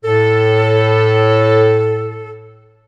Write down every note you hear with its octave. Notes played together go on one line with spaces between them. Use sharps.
A2 A4